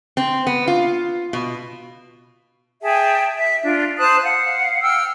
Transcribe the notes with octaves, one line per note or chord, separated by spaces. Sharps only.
C4
B3
F4
B2
G#4 E5 G5 A5
E5
D4 F4
C5 A5 D#6 F#6
F5 F#5
G5 E6 F6